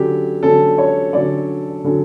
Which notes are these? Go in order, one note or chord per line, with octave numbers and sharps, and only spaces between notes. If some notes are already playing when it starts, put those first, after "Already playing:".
Already playing: D3 F#3 C#4 G4
D3 F#3 C#4 A4
C#5
D3 F#3 C#4 D5
D3 F#3 C#4